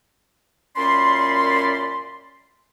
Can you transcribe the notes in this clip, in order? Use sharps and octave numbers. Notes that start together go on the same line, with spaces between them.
F#2 A#2 C#4 D5 B5 C6